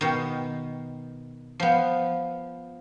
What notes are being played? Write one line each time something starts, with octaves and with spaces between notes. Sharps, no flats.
B2 D#3
F3 B3